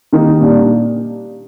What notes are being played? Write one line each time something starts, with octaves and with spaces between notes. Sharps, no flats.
D#3 A#3 D#4 G4
A#2 G3 D4